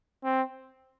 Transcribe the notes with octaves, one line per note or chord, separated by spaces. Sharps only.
C4